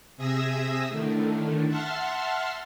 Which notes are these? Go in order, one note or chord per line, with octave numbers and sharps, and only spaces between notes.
C3 G#4 E5 D#6 E6 A#6
A2 D3 D#3 A3
E5 F#5 A5 C6 F6